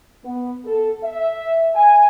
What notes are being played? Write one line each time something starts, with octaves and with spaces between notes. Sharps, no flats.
B3
A4
E5
G#5